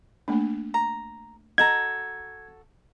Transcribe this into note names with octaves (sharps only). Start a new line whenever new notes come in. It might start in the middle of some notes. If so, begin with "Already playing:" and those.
A3 A#3 D4
A#5
F#4 A4 D#5 A#5 G#6